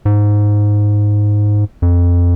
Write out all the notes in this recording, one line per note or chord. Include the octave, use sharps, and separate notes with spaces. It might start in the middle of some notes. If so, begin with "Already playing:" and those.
G#2
F2